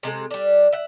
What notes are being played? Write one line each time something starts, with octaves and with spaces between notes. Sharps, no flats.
C3 G#3 A4
G3 D4
E5 F#5